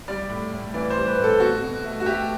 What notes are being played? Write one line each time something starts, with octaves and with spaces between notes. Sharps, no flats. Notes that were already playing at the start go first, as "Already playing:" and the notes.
G3 D5
A2
A2
E3 D5
C5
G3
B4
A2
A4
B2 F#4
B2
A3
F#4
A3 G4